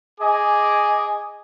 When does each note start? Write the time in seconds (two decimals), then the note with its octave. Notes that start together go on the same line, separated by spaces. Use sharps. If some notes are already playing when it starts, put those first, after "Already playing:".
0.21 G#4 D#5 G#5 D6